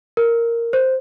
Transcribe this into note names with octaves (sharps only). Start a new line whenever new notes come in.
A#4
C5